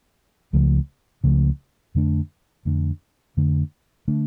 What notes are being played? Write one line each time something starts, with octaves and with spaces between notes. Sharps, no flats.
C#2 C#3 F3 A3
C#2 C#3 F3 A3
F2 D3 A3 D4
F2 D3 A3 D4
F2 D3 A3 D4
D3 A3 D4